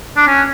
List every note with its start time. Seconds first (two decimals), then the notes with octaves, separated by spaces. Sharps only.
0.16 D4
0.27 C#4